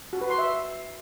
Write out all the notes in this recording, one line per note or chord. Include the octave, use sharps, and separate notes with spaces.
F#4
B4
C6
E5